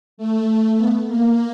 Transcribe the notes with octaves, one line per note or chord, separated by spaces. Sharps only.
A3
B3
A#3